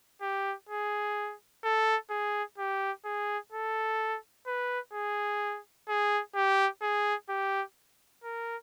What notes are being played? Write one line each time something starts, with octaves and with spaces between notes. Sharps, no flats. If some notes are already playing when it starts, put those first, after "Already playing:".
G4
G#4
A4
G#4
G4
G#4
A4
B4
G#4
G#4
G4
G#4
G4
A#4